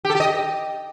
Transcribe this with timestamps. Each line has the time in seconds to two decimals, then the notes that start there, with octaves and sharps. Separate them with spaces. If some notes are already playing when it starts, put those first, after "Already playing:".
0.05 G4
0.10 A4
0.15 G4
0.20 D#5